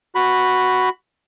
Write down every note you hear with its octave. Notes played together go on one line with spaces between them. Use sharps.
F#4 B5